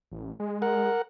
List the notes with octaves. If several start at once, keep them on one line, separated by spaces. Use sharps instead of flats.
A1
G#3
A#4 F#5